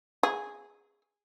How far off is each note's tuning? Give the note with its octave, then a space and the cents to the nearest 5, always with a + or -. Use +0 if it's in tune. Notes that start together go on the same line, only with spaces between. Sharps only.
G#4 -5